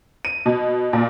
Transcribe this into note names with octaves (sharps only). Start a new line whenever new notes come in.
D#7
B2
A#2